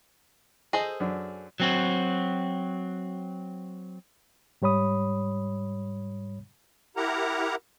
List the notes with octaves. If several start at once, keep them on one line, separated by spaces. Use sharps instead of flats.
G#4 A4 C5 D#5
F#2 D4
F#3 C4 F#4
G#2 G3 C#5 B5 D#6
E4 G4 A#4 F#5 A#5